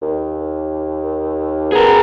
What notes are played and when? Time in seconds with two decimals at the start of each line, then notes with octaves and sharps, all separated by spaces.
0.02 D#2
1.72 B3 G#4 A#4